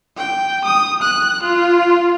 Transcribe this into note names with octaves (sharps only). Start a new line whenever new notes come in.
G5
D#6
F#6
F4